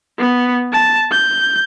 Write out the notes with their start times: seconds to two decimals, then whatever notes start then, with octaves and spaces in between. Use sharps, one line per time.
0.18 B3
0.73 A5
1.12 G6